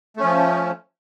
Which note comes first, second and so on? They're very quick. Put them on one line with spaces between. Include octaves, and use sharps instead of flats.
A3 C#4 F3